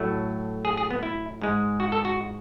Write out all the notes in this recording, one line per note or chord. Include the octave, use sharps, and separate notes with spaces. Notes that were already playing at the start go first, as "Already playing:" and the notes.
Already playing: A2 F#3 A3
G#4
G#4
B3
E4
G#2 G#3
F#4
A4
F#4